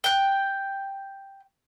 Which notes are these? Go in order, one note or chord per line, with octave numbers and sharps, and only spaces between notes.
G5 F#6